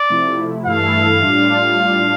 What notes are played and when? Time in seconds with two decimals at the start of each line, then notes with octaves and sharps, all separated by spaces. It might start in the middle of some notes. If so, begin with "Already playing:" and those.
Already playing: D5
0.10 C3 F3 A3 E4
0.66 G2 E3 A3 E4 A4 F5
1.22 A2 G3 D4 F4